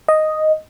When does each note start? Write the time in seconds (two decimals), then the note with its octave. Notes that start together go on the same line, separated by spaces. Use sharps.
0.08 D#5